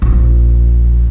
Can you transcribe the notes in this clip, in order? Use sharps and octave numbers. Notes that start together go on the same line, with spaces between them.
A#1